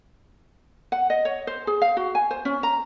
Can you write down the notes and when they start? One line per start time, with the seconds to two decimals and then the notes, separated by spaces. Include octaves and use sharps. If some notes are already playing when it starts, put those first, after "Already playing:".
0.92 F#5
1.10 D#5
1.25 C#5
1.47 C5
1.67 G#4
1.82 F5
1.97 F#4
2.15 G#5
2.31 C5
2.45 C#4
2.63 A#5